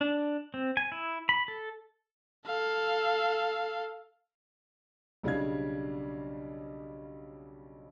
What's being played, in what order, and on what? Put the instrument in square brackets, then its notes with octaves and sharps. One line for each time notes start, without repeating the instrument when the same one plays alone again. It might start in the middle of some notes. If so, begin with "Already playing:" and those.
[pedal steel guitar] D4
C4
G#5
E4
B5
A4
[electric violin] A4 F5
[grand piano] B1 C#3 G3 D4 F5 G#6